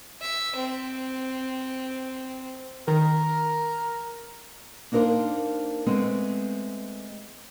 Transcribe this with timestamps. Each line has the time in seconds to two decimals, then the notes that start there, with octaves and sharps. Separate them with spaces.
0.21 E5
0.56 C4
2.88 D#3 A#4
4.92 A#3 D4 D#4 A#4 C5
5.86 G#3 A3 B3 C4